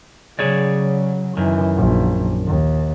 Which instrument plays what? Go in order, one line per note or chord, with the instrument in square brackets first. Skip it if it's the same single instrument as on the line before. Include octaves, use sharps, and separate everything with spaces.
[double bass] C#3 F#3 [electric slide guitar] G#4 C#5 D5
[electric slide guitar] F#2 D#3 [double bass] E3
[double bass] A#1
D#2